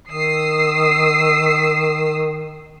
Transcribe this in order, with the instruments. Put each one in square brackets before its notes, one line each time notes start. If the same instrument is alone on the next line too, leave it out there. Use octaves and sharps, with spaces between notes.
[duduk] D#3 [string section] D#6 E6 C7